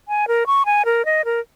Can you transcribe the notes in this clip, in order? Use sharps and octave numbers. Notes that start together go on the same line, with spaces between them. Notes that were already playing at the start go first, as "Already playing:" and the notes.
G#5
A#4
C#6
G#5
A#4
D#5
A#4